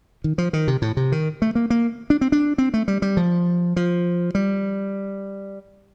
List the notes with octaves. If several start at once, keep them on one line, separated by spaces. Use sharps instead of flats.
D#3
F3
D#3
C3
A2
C3
D#3
A3
A#3
A#3
D4
C4
D4
C4
A3
G3
G3
F3
F3
G3